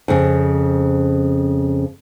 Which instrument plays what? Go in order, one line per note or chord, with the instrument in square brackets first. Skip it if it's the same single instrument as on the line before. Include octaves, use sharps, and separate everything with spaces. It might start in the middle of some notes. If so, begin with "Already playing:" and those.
[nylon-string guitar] F2 C#3